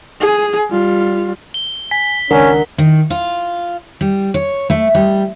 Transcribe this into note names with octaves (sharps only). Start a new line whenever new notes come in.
G#4
G3 F4
G7
G#5 B6
C#2 D#3 C#4 D4 A#4 F#5
D#3
F4
G3
C#5
A3
G3